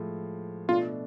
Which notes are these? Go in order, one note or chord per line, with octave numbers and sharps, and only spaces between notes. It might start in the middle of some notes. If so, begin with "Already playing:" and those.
Already playing: A2 F3 G#3
B2 A3 D4 F4